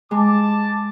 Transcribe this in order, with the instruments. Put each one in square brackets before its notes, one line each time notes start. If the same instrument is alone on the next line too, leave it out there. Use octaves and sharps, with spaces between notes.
[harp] G#3 [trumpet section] A5 D6